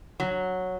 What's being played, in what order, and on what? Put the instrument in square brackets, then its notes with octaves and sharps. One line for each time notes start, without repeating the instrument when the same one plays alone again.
[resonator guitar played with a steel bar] F#3